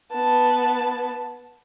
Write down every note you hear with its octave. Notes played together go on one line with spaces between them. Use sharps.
B3 A5